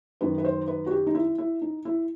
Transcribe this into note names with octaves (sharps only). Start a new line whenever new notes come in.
F#2 D#3 B4
B4
C5
B4
F#4
G4
D#4
E4
E4
D#4
E4